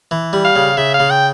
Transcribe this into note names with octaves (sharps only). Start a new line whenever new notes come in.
E3
G3
F5
C#3
C#3 E5
F5
C#3
G5